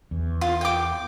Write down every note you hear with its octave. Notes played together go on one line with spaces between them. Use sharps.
E2
F4
G5 D6